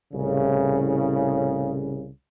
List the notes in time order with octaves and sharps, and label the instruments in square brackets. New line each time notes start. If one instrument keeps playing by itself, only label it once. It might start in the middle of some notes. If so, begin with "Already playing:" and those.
[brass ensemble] C2 A2 C#3